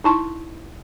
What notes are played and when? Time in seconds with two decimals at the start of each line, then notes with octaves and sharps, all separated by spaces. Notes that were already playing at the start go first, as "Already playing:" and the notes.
0.04 D#4 E4 A5 C6 C#6